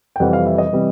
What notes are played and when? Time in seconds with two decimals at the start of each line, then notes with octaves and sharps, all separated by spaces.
0.16 G5
0.20 F2 C3 E3 G3 F#5
0.33 F5
0.47 E5
0.58 D#5
0.73 C3 E3 G3